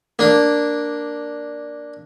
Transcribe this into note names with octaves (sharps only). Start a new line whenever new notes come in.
A#3 D4